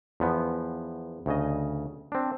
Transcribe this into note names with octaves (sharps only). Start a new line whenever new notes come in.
E2 F3 B3
D2 C#3 D#5
C4 D4